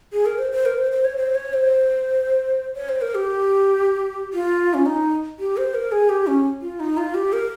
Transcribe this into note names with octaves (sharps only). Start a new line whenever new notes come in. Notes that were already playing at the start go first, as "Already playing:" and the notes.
G#4
A#4
C5
C5
A#4
C5
C5
C#5
C5
C#5
C5
C#5
C5
A#4
G4
F4
C#4
D#4
G4
C5
A#4
G#4
G4
C#4
F4
D#4
F4
G4
A#4